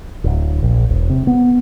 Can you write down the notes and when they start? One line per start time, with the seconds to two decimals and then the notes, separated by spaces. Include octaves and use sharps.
0.24 D1
0.63 A#1
0.89 E1
1.10 C3
1.27 B3